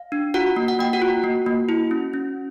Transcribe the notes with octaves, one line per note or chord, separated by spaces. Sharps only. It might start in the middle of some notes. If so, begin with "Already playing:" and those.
Already playing: F5
D4
F4 F#4 F#5
A#3
F#5
A#3 G5
F#4 F#5
F4
A#3
A#3
E4
C#4
C#4